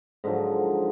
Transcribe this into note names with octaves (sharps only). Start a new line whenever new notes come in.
G#2 D3 F3 F#3